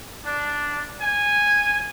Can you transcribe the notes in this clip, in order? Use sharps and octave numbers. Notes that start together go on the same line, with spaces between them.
D4
G#5